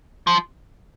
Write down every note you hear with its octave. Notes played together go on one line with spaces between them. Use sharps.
F3